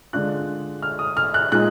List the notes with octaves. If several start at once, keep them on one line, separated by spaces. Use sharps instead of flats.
D3 G#3 D4 F4 F#6
F6
D#6
F6
F#6
A#2 G#3 D#4 F#6